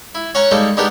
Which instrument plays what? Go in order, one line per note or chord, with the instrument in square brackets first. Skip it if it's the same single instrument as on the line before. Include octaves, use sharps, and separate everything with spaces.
[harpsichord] E4
C#4 C#5 F#5 G#5 A#5
G3 G#3 A#3 D#4 A4
G#3 B3 D4 D#4 G4 A#4